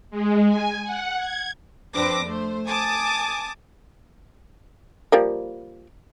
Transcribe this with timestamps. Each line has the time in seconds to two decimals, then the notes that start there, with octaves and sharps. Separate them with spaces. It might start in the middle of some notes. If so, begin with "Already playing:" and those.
0.11 G#3
0.48 G#5
0.84 F#5
1.17 G#6
1.94 F2 C4 D4 B4 D6 A#6
2.25 A3 C5
2.67 G#5 A5 D6 D#6
5.12 F3 G3 A#3